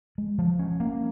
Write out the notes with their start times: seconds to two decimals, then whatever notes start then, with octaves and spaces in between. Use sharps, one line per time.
0.18 G#3
0.38 F3
0.59 C#4
0.80 A#3